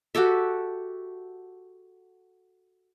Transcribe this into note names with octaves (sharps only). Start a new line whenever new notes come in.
F#4 G4 A4 E5